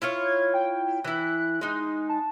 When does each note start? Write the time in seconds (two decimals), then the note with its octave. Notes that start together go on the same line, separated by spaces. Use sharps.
0.02 E4 F4 C#5
0.24 G#6
0.54 G5
1.04 E3 E4 F#6
1.61 G#3 D#4
2.09 A5